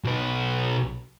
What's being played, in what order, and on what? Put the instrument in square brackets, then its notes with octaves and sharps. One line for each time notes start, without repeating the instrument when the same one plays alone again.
[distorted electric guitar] B1 B4